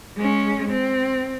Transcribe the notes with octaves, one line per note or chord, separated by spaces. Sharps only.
G#3 C#4
C4